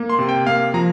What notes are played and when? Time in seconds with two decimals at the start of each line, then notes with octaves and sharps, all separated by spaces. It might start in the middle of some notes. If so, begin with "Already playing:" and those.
Already playing: A#3
0.10 C6
0.19 C3
0.29 G5
0.47 A#3 F5
0.74 F3 A#5